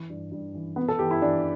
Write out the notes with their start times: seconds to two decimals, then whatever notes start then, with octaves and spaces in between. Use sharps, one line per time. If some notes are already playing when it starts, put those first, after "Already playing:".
Already playing: E3
0.09 G2
0.32 G2
0.55 E3
0.76 E3 B3
0.88 A4
0.99 E3 G4
1.11 E4
1.22 E3 D4